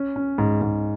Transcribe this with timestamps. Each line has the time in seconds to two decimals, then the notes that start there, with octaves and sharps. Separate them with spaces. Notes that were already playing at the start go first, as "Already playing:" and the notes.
Already playing: C#4
0.16 C#4
0.38 G#2
0.62 G#2